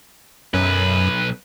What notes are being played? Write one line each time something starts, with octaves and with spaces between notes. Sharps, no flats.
B1 F#2 B4